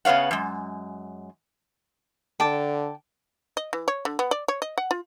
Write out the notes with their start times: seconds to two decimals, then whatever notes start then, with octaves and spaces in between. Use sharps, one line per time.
0.05 C#3 B3 C#5 F5 F#5
0.31 F#2 G#3
2.40 D3 G5 A5 D6
3.57 D#5
3.73 E3
3.88 C#5
4.05 D3
4.19 B3
4.31 D5
4.48 C#5
4.62 D#5
4.78 F#5
4.91 F4